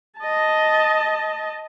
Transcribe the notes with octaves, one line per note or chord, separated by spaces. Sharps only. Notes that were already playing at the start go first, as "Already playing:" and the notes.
D#5 A5